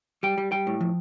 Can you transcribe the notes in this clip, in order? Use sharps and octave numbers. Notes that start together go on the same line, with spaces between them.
G3 G5
G3
G3 G5
A2
F3